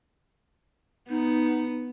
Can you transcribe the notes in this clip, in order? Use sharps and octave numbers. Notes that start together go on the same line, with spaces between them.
B3 D#4